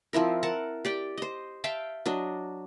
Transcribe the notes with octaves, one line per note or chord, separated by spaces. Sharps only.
F3 C4 E4 A#4
A#4 F#5 A5
G4 D5 G5
C5 D#5
E5 F5 G5 A5
F#3 D4 D#5